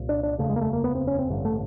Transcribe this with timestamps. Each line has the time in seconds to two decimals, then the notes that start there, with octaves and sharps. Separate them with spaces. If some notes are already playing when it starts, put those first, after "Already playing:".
Already playing: C2 A#2
0.09 D4
0.23 D4
0.38 F1 D#2 C#3 A3
0.50 G#3
0.56 A#3
0.61 A3
0.73 A#3
0.84 B3
0.95 C4
1.07 C#4
1.19 C4
1.30 A1 G2 D3
1.45 A3